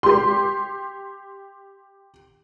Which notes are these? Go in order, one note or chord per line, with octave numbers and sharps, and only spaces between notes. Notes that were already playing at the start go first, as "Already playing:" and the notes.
G4 C6